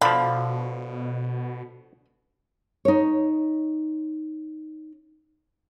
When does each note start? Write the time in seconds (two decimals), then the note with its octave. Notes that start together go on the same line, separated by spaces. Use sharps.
0.01 B2 D3 F3 F5 B5
2.85 D#4 C#5